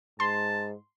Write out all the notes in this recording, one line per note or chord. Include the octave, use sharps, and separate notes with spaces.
G#2 A5 C6